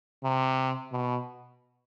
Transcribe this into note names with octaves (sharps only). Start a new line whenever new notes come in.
C3
B2